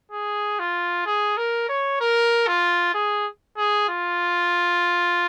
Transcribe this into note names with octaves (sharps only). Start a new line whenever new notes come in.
G#4
F4
G#4
A#4
C#5
A#4
F4
G#4
G#4
F4